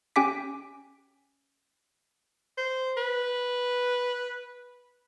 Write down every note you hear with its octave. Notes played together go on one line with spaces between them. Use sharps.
C#4 G4 G5 G#5 D6 B6
C5
B4